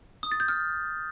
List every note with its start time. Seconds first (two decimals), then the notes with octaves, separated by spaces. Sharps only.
0.23 D#6
0.32 A6
0.40 G6
0.48 F6